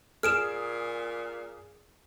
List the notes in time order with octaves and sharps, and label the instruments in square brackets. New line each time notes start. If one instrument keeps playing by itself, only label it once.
[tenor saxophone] A#2 [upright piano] G#4 [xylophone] F6 D7 E7